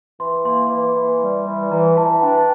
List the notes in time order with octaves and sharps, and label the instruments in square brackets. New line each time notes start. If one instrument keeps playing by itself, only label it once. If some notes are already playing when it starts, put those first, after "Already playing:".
[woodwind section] E3 [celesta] C6
[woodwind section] A#3 [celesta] C6
[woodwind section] E3
E3
G3
E3
[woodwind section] E3 [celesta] A#5
[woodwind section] E3 [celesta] A5
[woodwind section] D4 [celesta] G5